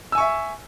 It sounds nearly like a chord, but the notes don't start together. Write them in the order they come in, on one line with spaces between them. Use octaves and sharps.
E6 G#5 C#6 E5